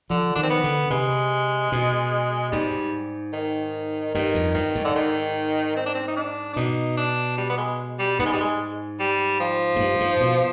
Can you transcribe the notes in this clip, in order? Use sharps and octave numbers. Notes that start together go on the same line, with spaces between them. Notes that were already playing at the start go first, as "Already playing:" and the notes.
D3 F3
D#3 D4
C4
B3
D3
C3 G#3
B2
G#2 G3
D#3
G2 D#3
F2
G2 D#3
G#2
D3
D#3
C4
D4
C4
D#4
D4
D4
B2 D#4
D4
G3
B3
G#3
G3
G#2 B3
G#3
G3
G#3
G3
F3
G#2
G2
G#2
B2